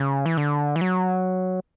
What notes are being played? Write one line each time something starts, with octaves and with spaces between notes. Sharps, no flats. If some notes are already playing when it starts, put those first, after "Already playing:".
Already playing: C#3
E3
D3
E3
F#3